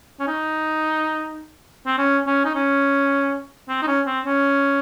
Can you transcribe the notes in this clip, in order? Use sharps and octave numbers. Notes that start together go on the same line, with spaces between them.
C#4
D#4
C4
C#4
C#4
D#4
C#4
C4
D#4
C#4
C4
C#4